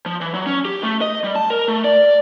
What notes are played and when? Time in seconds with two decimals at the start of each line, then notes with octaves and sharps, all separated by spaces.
0.06 F3
0.21 E3
0.34 F#3
0.46 C#4
0.65 G4
0.83 A3
1.01 D#5
1.24 G3
1.36 A5
1.50 A#4
1.68 A3
1.84 D5